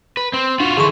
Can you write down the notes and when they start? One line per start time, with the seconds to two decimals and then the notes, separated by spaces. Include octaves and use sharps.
0.17 B4
0.33 C4
0.60 D4 F4 F#4
0.77 D3 E3 G#4 C6 C#6